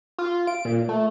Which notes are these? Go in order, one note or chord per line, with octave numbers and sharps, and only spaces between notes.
F4
D7
A#2
A3